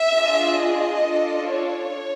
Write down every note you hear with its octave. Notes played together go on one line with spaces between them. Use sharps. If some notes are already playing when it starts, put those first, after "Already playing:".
Already playing: E5
D4 F4 G#4
D#5
D4 F4 A4
C#5